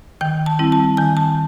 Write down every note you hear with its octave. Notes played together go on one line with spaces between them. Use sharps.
D#3 G5
A5
G3 C4 E4
A5
D#3 G#5
A5